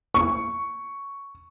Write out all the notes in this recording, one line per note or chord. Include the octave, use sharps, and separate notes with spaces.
C#6